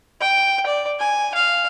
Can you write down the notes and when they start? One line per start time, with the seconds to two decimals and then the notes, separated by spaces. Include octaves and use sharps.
0.21 G5
0.66 D5
0.99 G#5
1.35 F5